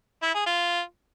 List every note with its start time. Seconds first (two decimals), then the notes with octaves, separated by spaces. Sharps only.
0.23 E4
0.34 G#4
0.46 F4